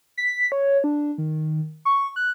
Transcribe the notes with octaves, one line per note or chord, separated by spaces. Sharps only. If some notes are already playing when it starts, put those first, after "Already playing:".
B6
C#5
D4
D#3
C#6
F#6